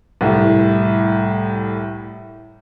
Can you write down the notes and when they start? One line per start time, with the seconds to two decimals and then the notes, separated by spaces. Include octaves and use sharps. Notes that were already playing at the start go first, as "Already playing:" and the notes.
0.21 C2 A2